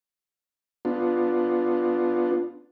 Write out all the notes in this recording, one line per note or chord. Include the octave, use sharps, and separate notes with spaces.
B3 D4 F4